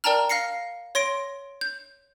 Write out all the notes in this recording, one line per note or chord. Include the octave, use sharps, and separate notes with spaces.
A#4 D5 G5 A5 A#5 F6
F5 F6 A#6 C7 C#7
C#5 C6 A#6 D7
G6